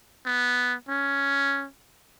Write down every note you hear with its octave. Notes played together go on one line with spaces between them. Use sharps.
B3
C#4